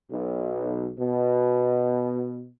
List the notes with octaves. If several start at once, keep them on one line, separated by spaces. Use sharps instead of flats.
B1
B2